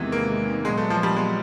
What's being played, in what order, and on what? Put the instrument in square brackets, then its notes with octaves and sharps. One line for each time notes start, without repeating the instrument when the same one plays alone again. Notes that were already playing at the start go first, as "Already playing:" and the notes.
Already playing: [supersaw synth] E2 C3 D#3 G#3 B3 [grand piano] E3
[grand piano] A#3
[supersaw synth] A#2 F#3 B3 [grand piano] G#3
[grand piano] A3
F3
G3
G#3